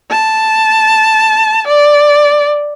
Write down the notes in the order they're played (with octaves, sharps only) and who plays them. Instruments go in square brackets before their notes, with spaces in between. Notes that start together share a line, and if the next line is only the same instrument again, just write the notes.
[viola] A5
D5